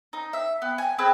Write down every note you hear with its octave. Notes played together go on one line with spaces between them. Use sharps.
D#4
E5
B3
G#5
C4 G#4 B4 E6